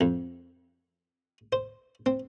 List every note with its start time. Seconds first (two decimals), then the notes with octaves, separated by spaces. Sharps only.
0.01 F2
1.53 C5
2.06 C4